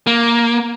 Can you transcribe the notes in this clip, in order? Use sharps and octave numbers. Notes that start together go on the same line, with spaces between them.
A#3